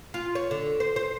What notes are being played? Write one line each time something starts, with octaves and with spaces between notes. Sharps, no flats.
F4
C#5
D3
C5
C5